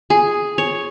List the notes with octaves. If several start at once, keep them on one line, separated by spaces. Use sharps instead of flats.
G#4
C#5